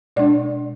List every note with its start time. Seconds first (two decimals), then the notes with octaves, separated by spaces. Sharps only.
0.16 B2 G#3 D4 D5